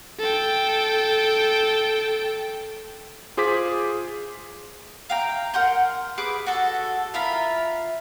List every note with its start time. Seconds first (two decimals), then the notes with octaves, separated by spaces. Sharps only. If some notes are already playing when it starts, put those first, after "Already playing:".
0.19 A4 G5
3.37 F4 G#4 C5 D6 B6
5.10 F5 G5 A#5
5.54 A#4 F#5 C6 G6
6.18 G#4 B4 D6
6.46 F#4 A4
7.14 E4 F4 A#4 B5